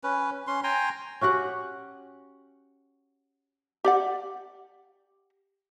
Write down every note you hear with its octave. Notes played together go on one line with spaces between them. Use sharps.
C#4 B4
C#4 C6
G5 G#5 A#5 C6
C#4 F#4 G4 F#5
G4 D5 F#5